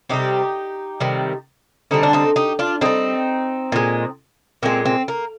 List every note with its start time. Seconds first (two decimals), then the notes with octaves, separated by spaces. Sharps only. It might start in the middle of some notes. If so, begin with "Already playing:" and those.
0.09 C3 D#3 G3 D#4 G4
1.00 C3 D#3 G3
1.91 D3 G3 C4 D#4
2.03 D4
2.13 C4 D#4
2.36 D#4 G4
2.59 D4 F4
2.81 D3 G3 C4 D#4
3.72 A#2 G#3
4.63 A#2 G#3 C4
4.86 C4
5.08 A#3